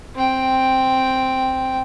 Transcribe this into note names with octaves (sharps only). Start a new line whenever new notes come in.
C4 G5